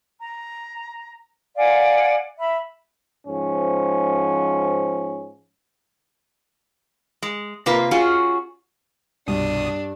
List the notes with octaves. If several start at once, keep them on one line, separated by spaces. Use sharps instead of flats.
A#5
D5 F5 F#5 G#5
E5 B5
G#2 F3 C#4
G#3
C3 A#3 F4 B4
C#4 F4 F#4 G#4
C2 G2 B2 D4 D#6